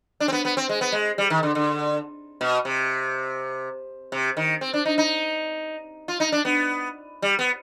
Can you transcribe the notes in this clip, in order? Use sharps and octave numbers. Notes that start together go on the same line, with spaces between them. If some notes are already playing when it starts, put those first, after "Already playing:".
D4
C4
B3
B3
C4
G#3
B3
G#3
G3
D#3
D3
D3
B2
C3
C3
D#3
C4
D4
D#4
D#4
F4
D#4
D4
B3
G3
B3